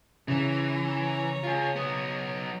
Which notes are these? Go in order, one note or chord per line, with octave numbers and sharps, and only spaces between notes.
C#3 E3 C#5 A#5
F4 G#4
F#3 B3